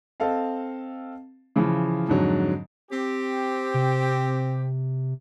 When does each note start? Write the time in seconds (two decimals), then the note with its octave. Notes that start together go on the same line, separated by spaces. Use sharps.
0.20 C4 A4 D#5 F5 A5
1.56 C#3 E3 F3
2.09 F2 G#2 D3 F#3
2.91 C4 G4
3.74 C3